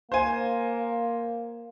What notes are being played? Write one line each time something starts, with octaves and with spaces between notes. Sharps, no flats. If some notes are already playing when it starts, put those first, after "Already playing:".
A#3 C5 G#5